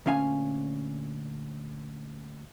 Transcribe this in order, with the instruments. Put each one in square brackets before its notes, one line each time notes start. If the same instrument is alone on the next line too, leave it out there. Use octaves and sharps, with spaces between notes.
[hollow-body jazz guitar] D2 A#2 C#4 F5 G#5